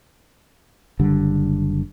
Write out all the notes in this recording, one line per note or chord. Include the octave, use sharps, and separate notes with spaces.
F#1 D3 G3